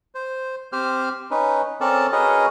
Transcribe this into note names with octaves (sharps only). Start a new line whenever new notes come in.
C5
C4 G4 C5 F6
C#4 D#4 B4
C4 C#4 A4 A#4 D5 A5
C#4 F#4 G#4 A#4 B4 D#5